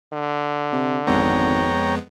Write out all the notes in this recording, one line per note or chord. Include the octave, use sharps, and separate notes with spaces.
D3
C3
G#1 F2 G#3 B3 C#5 G5 A#5